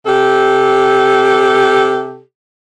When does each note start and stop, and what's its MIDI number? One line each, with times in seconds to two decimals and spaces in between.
0.06 2.22 48
0.06 2.22 67
0.06 2.22 69